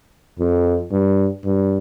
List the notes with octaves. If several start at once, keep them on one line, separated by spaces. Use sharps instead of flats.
F2
G2
G2